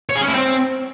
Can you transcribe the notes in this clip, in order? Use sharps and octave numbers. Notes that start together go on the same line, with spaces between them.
C#5
G#4
C#4
E4
C4